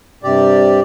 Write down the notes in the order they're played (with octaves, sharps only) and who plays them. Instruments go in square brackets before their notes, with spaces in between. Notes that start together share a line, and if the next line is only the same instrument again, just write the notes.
[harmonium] G2 C3 G4 D5